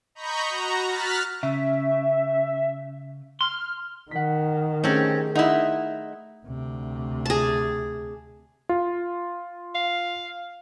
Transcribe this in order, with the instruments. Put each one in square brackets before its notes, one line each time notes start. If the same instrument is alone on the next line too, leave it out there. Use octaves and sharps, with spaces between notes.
[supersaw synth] D#5 A#5 B5 C#6 G6
F#4 A#5
F6 F#6 A6 B6
[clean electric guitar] C#3 [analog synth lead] E5
[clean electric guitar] C6 [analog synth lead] F6
[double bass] D#3 [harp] F#5 B6
[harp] A3 G4 G#4 [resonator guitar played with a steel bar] C4 C#4
[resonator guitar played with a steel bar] D#4 E4 [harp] D#5 F#5 C6
[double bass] D2 C3
[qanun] G#4 A5
[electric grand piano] F4
[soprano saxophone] F5